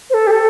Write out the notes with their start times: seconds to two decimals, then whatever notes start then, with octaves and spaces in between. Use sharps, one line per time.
0.10 C5
0.14 A4
0.27 G4
0.31 A4